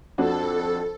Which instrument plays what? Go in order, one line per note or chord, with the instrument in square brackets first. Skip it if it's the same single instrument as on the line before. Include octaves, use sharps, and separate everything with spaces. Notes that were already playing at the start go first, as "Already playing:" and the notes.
[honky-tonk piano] F2 D4 F#4 [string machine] A4